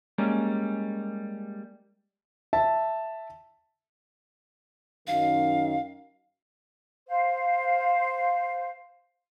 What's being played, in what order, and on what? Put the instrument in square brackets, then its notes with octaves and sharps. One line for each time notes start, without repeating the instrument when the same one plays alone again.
[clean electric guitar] G3 G#3 A#3 C#4
[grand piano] E5 A5
[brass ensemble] F#2 D#3 [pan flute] F5
[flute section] C5 F5